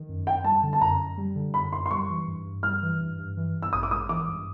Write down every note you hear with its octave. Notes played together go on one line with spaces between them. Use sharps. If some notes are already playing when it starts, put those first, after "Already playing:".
Already playing: D#3
F#2
F#2 G5
G3 A5
D3
A5
F#2 A#5
F#2
G3
D3
F#2 B5
F#2 C6
C6
G3 C#6
E3
G2
G2
G3 F6
E3
G2
G2
E3
G2
E6
A1 D#6
D6
G#3 D#6
E3 D6
G2